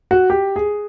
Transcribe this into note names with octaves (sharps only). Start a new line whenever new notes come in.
F#4
G4
G#4